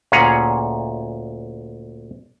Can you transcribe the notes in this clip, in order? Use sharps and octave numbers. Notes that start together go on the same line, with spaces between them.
D2 A#2 C#4 G#4 F#5 A#5